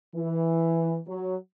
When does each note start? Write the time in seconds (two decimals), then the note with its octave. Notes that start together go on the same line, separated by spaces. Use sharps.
0.15 E3
1.07 F#3